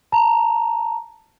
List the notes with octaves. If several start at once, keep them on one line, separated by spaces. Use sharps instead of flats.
A5 A#5